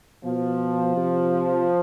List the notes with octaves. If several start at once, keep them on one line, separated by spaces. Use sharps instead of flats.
B2 F3
C3